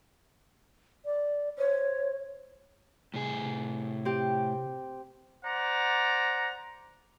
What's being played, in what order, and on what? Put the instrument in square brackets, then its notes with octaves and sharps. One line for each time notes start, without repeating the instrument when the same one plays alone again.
[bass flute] D5
[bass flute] C5 [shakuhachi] C#5
[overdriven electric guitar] A2 G#4 [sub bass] C3
[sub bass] C3
[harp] C4 G4
[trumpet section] C5 D5 F#5 A#5